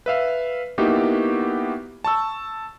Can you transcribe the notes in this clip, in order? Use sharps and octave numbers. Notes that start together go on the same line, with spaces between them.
B4 E5 F5
A#3 B3 D#4 E4 F#4 G4
A5 C#6 E6